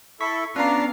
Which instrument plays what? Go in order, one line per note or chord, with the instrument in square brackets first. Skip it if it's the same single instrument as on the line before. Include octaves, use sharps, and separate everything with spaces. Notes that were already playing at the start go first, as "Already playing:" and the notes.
[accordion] E4 A4 [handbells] C#6 B6
[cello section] B3 F5 [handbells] C#4 [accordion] D4 [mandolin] F4 A#5